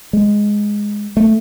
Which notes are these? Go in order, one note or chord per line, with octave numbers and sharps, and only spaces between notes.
G#3
A3